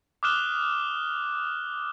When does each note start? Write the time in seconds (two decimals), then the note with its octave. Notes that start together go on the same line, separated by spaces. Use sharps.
0.23 D6 D#6 F6 F#6 E7 G7